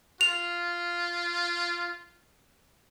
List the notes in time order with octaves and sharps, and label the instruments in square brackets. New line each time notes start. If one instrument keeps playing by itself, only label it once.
[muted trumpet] F4 [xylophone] F7